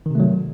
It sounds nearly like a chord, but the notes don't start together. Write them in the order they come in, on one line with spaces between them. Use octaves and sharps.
D#3 C3 A3 F#3